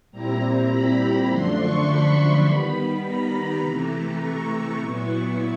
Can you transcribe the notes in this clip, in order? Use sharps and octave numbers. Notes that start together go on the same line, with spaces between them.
A#2 G3 C4 E4 A#5
B5
F#2 D3 F3 A3 D4 C6
C#6
B5
D#3 G3 B3
A#5
C3 E3 A3
C#6
A#2 F#3 B3 E4